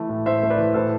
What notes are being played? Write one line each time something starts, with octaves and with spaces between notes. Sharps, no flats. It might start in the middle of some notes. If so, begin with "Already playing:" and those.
Already playing: E3 A3
A2
A2 C5 E5
A3
B4 D5
E3
A2 A4 C5